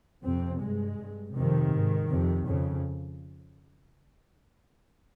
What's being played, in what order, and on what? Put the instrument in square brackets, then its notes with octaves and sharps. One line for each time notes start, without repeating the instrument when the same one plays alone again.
[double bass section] F2 C3 C4
G2 G#3
G2
F2 C3 D#3
G#2
F2 C3
F2 C#3